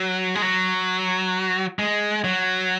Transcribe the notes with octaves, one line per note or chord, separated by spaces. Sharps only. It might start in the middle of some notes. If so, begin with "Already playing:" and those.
Already playing: F#3
G#3
F#3
G#3
F#3